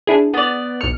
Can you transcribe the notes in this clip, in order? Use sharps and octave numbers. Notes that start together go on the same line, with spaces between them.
D4 E4 G#4
B3 D5
B1 F6 C#7